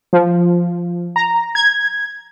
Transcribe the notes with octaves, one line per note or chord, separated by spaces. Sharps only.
F3
A#5
G#6